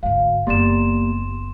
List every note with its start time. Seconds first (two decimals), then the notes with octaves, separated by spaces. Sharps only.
0.03 G#1 D2 F5
0.47 F#1 A#3 B3 G4 D5 C6 E7